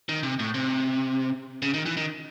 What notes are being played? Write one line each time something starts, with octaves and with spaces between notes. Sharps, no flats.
D#3
C3
A2
C3
C#3
D#3
E3
D#3